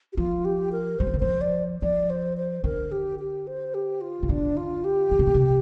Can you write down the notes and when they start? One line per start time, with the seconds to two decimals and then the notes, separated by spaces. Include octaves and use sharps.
0.13 G4
0.17 F3 F4
0.45 G4
0.72 A#4
0.99 G3 C5
1.07 F3
1.14 D3
1.20 F3 C5
1.41 D5
1.82 F3 D5
2.10 C5
2.37 C5
2.64 D3 A#4
2.92 G4
3.19 G4
3.47 C5
3.74 G4
4.01 F4
4.23 C3
4.29 D3 D4
4.57 F4
4.84 G4
5.11 D3
5.19 C3
5.27 A#2
5.34 C3